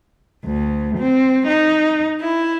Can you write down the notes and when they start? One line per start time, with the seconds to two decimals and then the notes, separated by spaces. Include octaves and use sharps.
0.45 D2
0.98 C4
1.47 D#4
2.21 E4